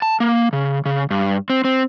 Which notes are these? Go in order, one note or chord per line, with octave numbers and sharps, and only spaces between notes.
A5
A#3
C#3
C#3
G2
C4
C4